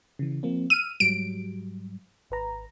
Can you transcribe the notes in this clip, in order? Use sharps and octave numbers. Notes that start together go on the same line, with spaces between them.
C#3 E3
F3 A#3 C4
E6 F6 D#7
G#2 F#3 G3 D7
G#1 B4 A#5